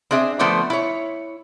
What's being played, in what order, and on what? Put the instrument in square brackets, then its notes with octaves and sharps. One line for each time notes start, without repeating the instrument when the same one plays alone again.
[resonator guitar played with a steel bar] C4 D4 G#4 E5
D3 F3 A3 B3 C5 D5
E4 C#5